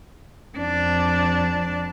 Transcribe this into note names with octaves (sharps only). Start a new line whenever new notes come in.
F2 D4